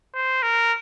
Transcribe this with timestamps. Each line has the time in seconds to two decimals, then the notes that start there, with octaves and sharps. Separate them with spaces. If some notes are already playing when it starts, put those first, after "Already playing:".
0.14 C5
0.43 A#4